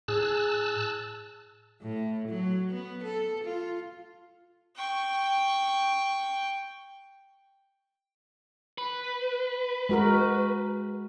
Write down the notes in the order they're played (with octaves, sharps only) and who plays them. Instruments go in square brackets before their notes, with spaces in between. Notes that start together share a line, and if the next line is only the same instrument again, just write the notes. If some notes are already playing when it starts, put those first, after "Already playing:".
[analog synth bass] A2 [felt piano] G#4 [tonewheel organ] A5 E6 F#6
[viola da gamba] A2
F#3
B3
A4
F4
[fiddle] G5 C#6
[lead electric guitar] B4
[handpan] G#3 F#4 A#4